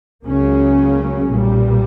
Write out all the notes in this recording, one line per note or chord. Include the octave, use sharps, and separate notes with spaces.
C#2 C#3 F#3 A#3 C#4
B1 A#2 G3